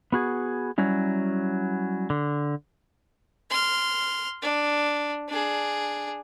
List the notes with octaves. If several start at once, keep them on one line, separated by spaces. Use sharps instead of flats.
B3 F#4 G#4
F#3 G3 C#4 E4
D3
C6 F6
D4
D4 G#4